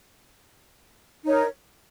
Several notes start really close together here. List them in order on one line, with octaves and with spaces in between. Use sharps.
D#4 C#5 A#4